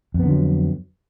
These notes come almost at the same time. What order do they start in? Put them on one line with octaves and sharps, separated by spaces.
F2 B3 D3 F#3